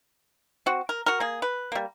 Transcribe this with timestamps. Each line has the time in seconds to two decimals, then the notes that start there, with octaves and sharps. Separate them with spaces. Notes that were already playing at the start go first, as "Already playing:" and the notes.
0.66 C4 F#4
0.89 A#4
1.06 F#4 A#4
1.20 A#3 G#4
1.42 B4
1.72 G3 A#3